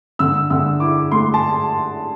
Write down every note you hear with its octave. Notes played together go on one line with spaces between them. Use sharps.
D3 E6
D3 E6
E4 D6
A3 C6
A5